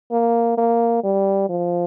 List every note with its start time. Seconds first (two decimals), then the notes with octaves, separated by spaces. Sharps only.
0.12 A#3
0.58 A#3
1.04 G3
1.49 F3